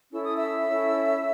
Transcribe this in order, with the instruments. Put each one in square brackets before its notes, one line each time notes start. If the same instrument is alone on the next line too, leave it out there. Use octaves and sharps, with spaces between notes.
[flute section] C#4 E4 A4 E6
D#6
E5 E6
C#4 E4 A4